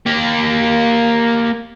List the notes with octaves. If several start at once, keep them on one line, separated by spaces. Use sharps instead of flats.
A#3 G4